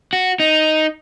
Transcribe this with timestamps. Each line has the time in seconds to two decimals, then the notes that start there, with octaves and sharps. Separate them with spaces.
0.13 F#4
0.40 D#4